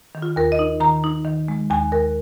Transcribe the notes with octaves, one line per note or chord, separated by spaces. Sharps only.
D#3
F4
D#2 A#4
D#5
D#4
D#3 A#5
D#4
D#3
G#3
D#2 G#5
D#2 A#4